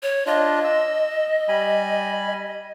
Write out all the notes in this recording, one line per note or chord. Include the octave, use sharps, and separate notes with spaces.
C#5
D4 F4 D#5
E6
G3 G#5 B5